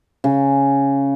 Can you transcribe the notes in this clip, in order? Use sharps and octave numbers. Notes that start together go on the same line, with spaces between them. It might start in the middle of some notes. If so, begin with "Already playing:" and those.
C#3